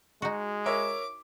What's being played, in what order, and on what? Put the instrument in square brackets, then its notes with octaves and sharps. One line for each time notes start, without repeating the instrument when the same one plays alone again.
[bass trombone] G#3 [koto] D#4 F#4
[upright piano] A#4 C#5 E5 [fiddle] D6